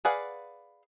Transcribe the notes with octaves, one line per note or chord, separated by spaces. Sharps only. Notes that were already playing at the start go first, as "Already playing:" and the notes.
G#4 B4 D5 F5 F#5